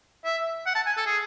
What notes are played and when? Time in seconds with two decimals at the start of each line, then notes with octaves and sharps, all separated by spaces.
0.25 E5
0.66 F#5
0.75 A5
0.86 G#5
0.97 A4
1.06 G#4